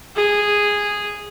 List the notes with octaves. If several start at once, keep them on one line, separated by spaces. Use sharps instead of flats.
G#4